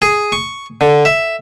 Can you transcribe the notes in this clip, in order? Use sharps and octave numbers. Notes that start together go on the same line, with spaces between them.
G#4
C#6
D3
E5